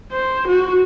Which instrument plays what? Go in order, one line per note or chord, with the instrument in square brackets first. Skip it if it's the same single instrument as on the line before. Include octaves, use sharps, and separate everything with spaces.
[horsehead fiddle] C5
F#4